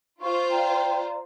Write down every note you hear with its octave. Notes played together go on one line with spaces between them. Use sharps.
F4 C5 C#6
D5 G5 A#5